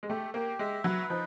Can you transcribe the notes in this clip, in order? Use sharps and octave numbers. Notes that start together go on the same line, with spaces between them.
G#3
A3 G4
A#3 G4
G#3 E5
F#3 B4
F3 D#4